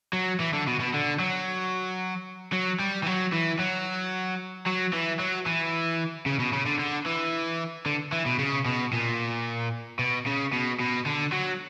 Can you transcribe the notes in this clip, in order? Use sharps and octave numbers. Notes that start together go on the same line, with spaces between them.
F#3
E3
D3
B2
B2
D3
F#3
F#3
G3
E3
F#3
E3
F#3
F#3
E3
F#3
E3
C#3
B2
C#3
D3
D3
E3
D3
E3
B2
C#3
B2
A#2
B2
C#3
B2
B2
D3
F#3